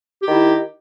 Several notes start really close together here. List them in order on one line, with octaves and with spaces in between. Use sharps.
G4 D#3 E4